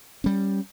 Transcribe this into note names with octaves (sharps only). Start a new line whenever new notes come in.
G3 C#4